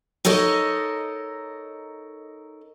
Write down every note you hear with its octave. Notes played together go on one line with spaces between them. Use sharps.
D#4 A4 A#4 C#5 D#5